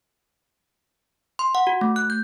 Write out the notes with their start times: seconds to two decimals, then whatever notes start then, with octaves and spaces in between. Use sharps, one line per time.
1.39 C6
1.55 F#5
1.67 F#4
1.81 A3
1.96 F#6
2.10 G6